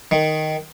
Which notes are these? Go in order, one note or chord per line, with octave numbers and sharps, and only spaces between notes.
D#3